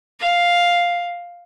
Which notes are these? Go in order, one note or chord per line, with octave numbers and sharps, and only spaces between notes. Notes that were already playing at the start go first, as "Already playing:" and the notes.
F5